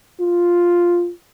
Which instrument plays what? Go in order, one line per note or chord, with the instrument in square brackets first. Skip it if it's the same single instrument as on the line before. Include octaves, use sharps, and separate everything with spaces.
[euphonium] F4